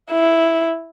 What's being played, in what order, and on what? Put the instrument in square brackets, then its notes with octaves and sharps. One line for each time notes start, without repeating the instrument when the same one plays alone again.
[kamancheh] E4